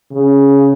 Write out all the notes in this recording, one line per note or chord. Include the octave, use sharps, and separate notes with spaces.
C#3